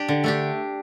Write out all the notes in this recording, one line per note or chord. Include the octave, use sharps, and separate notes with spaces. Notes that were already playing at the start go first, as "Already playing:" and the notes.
Already playing: D4 G4
D3
A3 D4 G4